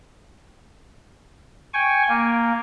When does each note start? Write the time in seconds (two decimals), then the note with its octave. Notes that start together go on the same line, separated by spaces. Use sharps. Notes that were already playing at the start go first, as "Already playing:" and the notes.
1.74 G5 G#5 C#6
2.09 A#3